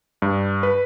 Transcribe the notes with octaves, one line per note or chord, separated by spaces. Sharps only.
G2
B4